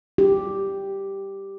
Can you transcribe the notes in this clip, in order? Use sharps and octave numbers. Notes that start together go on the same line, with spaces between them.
G4